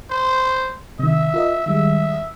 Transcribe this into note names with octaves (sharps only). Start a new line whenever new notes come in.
C5
C3 D#3 E5
F4 A#4 D#5
D#3 G3 G#3 E5